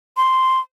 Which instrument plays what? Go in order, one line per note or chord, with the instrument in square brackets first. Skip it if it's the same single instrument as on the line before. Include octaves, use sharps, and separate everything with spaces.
[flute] C6